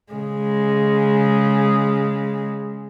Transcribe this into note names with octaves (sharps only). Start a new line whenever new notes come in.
C#3 G#3